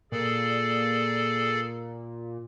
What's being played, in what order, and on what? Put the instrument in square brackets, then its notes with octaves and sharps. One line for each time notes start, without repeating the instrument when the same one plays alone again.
[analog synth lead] A#2 [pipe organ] G#4 A4 D5